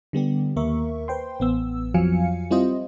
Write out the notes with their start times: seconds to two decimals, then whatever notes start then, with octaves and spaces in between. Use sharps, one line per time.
0.13 D3 G3 B3 G4
0.56 D#2 A#3 A#4 E5 C#6
1.08 B4 C5 G5 C6
1.40 A1 B3 E6
1.94 F2 F3 F#3 F5 G#5 C#7
2.51 G3 C4 E4 F4 C5 D#5